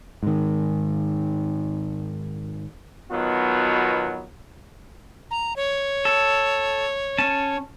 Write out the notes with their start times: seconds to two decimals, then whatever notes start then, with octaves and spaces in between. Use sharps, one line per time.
0.23 G#2 D#3
3.11 B2 D#3 F#3 B3 F4
5.31 A#5
5.56 C#5
6.05 A4
7.18 C#4 A5